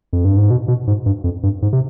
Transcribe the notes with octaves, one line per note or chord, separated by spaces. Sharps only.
F2
G2
G#2
B2
B2
G#2
G2
F2
G2
G#2
C3